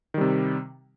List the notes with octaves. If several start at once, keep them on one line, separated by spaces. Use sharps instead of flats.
C3 D#3 G3